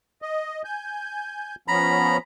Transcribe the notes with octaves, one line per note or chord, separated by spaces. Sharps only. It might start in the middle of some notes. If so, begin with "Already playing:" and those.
D#5
G#5 G6
F3 B3 C#4 A#5 B5